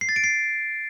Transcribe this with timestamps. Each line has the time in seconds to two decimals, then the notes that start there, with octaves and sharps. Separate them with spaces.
0.01 C7
0.09 A6
0.16 D7
0.24 C7